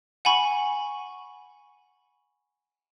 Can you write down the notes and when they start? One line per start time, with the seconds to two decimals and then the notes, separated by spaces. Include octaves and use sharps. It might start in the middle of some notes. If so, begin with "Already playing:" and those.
0.25 F#5 G#5 B5 C#6